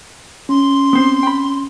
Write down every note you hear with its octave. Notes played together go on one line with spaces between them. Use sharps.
C#4 C6
B3 C4 C5
G5 B5